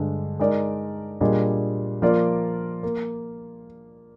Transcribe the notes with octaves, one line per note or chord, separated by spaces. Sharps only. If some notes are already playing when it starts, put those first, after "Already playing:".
Already playing: G2 D3 G#3
G#3 D#4 A#4 D5
A#2 G3 D4 G#4 D#5
F3 A#3 F4 A#4 D5
A#3